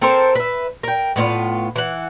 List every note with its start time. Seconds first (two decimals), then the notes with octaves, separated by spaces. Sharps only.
0.02 C4 A4 A#4 C5
0.35 B4 E5
0.83 A#4 G5
1.16 A2 B3 D#4 F4
1.76 E3 F#5